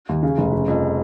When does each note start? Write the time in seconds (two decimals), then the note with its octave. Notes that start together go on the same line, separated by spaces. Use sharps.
0.09 D#2
0.23 C#3
0.38 F1
0.53 C#3
0.68 F2